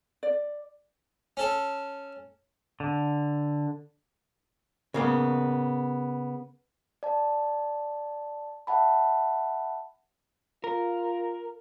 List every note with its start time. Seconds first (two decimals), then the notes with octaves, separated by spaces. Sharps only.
0.23 D5
1.37 C#4 A4
2.80 D3
4.94 C#3 A#3 B3
7.03 D5 A5
8.67 E5 F#5 A5 B5
10.64 F4 A#4